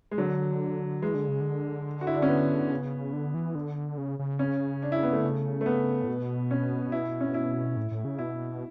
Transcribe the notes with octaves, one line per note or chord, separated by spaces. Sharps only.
G#3
D3 F#3
E3 G#3
D3
C#3
D3
F#4
E4
D4
C#4
B3
C#3
D3
E3
D3
C#3
C#3
C#4
D4
E4
B3
D3 A3
C#3
A3
B3
A2
B2
C#4
E4
C#4
E4
A2
A2
C#3
B2 E4